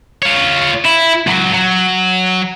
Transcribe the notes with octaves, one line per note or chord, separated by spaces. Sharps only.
F4 C#5
E4
C#2 F#3
F#3